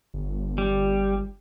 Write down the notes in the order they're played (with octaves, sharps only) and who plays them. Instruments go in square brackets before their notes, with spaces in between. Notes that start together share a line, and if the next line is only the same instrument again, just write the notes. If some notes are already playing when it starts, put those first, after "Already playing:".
[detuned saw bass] G1
[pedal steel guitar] G3